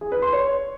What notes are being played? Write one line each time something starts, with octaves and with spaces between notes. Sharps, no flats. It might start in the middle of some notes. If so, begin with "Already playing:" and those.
G#4
B4
C6
C#5